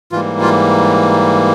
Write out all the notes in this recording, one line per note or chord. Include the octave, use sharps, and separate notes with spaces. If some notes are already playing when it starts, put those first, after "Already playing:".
G#2 E3 G3 A#3 F4
F4